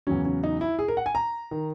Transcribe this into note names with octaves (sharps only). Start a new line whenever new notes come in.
E2 C#3 F#3 C#4
C#4
D#4
E4
G#4
A#4
F#5
G#5
A#5
D#3